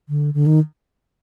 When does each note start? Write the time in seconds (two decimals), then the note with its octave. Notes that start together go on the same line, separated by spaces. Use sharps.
0.09 D3
0.34 D3
0.46 D#3